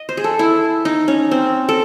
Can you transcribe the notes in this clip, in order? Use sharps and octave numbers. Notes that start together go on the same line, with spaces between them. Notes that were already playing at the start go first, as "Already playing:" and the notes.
Already playing: D#5
C5
G#4
A4
E4
D#4
C#4
C4
A4